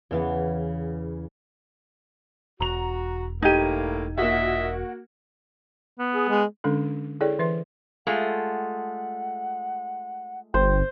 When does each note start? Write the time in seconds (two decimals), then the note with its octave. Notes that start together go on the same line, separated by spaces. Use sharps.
0.11 E2 C#3 E3 B3
2.60 E1 F#4 A#5 F7
3.42 A2 A#3 D#4 G4 G#6 D#7
4.18 A#2 A#3 F#4 D#5 E5
5.99 B3
6.14 G#4
6.29 G#3
6.64 D3 G#3 C#4 D4 A4
7.21 E4 G#4 A4 C#5 D5 G5
7.39 E3 B4 E5 C6
8.07 G#3 A3 F4 F#5
10.54 G1 C5 G5